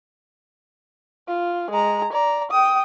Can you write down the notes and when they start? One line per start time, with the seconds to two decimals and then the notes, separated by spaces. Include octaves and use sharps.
1.28 F4
1.71 G#3 A#5
2.13 D5 A#5
2.51 G5 D#6